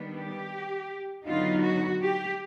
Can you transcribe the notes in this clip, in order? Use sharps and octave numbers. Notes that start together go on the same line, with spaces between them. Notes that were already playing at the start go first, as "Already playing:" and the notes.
Already playing: D#3 G3 B3 D4
G4
D3 F#3 B3 D#4 F4
F#4
G4